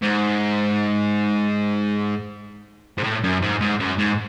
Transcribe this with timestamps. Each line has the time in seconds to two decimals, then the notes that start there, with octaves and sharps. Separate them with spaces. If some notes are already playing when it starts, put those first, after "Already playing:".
0.02 G#2
2.98 G#2
3.04 A2
3.24 F#2
3.42 G#2
3.61 G#2
3.80 F#2
3.98 G#2